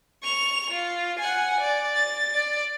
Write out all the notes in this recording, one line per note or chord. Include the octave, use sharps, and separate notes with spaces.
C#6 F7
F4
F#5 G#5
D5
A6
D5